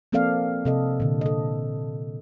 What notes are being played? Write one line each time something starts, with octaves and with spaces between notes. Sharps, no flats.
F3 A#3 C4 A4 D5 F5
C3 A4 D#5
A#2 D3
A4 D#5